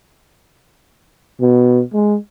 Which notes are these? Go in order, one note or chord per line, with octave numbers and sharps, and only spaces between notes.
B2
G#3